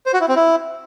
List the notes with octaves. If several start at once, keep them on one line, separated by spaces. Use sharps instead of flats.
C5
F#4
E4
C4
E4